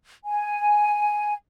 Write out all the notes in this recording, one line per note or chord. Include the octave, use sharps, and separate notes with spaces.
G#5